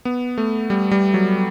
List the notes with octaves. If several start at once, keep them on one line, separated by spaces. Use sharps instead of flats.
B3
A3
G3
G3
F#3